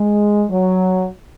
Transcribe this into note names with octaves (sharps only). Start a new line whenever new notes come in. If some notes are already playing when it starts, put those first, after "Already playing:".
Already playing: G#3
F#3